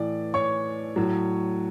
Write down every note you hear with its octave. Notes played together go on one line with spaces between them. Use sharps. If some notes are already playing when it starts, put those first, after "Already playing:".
Already playing: A2 E3 D5
C#5 C#6
A2 F#3